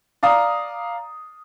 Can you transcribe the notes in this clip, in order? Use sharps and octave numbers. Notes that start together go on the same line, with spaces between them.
D5 F5 A#5 D#6